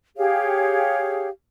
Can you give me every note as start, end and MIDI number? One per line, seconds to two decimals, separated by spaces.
0.17 1.27 67
0.17 1.27 68
0.17 1.27 73
0.17 1.27 77